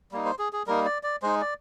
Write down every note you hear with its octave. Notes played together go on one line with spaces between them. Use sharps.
G3 A#3 D#4
C5
G#4
G#4
G3 A#3 D#4 A#4
D5
D5
G#3 D#4 C5
D5